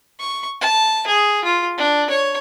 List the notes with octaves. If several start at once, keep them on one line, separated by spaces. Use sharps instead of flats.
C#6
A5
G#4
F4
D4
C#5